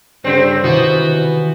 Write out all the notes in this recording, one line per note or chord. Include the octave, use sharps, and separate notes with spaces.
G2 C#3 C4 C5
C3 D#3 E3 G3 B3 F#4